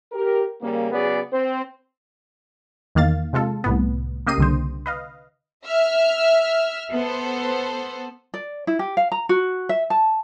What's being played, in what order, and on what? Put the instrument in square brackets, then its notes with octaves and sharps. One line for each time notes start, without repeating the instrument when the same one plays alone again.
[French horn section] G4 A#4
C#3 G3 A#3
C#3 F#3 B3 G#4 D5
C4 C5
[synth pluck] E2 D#3 A#3 F5 A6
C3 G#3 F4 A4
C2 A2 B3
C#3 A#3 G4 D#5 C7 D#7
C2 D3 C5
B4 D#5 F5
[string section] E5 F6
B3 A4 C5
[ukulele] D5
E4
G4
F5
A#5
F#4
E5
A5